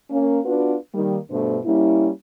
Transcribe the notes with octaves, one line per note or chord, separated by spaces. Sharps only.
A#3 C#4
B3 D4 F4 F#4 B4
D#3 G3 A#3
G2 B2 A3 D4 C5
G3 A#3 C#4 E4